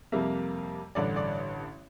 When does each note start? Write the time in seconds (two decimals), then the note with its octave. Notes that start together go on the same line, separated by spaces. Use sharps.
0.12 F2 C3 G3 A#3 E5
0.95 A1 G2 D3 D5
1.16 D5